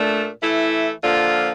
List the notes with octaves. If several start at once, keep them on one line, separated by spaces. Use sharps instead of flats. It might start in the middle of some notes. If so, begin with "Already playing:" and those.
Already playing: A#2 A3 D4
E3 A3 E4
D3 F3 A#3 F4